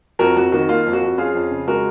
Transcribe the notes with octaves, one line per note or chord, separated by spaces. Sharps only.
F2 F#4 A#4
F2 F#4
D#3 F#4
A#3 F4
F2
F#4
F2
C#4 F4 G#4
F2
C#3
G#3 F#4 A#4